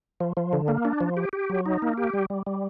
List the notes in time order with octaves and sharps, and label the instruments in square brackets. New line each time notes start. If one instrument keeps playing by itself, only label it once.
[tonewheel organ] F3
F3
D3
A#3
D4
F3
G4
G4
F#3
D#4
A#3
G4
G3
G3
G3